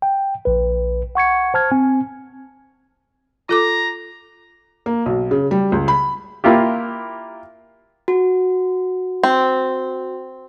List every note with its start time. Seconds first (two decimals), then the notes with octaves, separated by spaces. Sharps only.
0.02 G5
0.45 A#1 B4
1.15 F#5 C#6 G#6 C#7
1.54 C5 A5 F6 G#6
1.71 C4 G#5
3.49 F4 A4 A#5 D6
4.86 A#3
5.06 B1
5.31 C#3
5.51 G3
5.72 C#2
5.88 B5
6.44 A#3 E4 F4 G4
8.08 F#4
9.24 C4